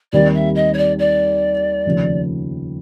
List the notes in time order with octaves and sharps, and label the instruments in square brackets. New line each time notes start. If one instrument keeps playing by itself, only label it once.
[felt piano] D#2 D#3 G3 C4 [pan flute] D5
[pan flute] E5
D#5
C#5
D5
D5
[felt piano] F1 D#2 C#3 F3